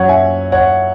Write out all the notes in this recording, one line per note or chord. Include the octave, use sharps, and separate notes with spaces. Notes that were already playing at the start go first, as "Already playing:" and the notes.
Already playing: F#2 F#3 C#5 F#5
E5 G#5
C#5 F#5